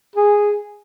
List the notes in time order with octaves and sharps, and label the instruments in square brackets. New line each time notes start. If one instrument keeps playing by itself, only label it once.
[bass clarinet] G#4